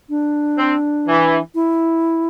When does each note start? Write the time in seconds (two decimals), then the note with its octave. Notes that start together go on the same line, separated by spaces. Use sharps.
0.10 D4
0.58 C4
1.07 E3
1.55 E4